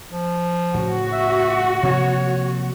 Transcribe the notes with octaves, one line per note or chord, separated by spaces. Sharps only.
F3
A2 C#3 F#4
E5
C3 F3 A#3 C#5